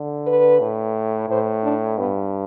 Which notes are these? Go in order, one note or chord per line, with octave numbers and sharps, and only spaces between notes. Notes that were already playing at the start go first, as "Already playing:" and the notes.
Already playing: D3
B4
A2
A2 C5
D4
G2 B3